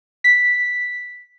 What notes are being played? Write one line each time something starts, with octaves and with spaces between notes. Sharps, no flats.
B6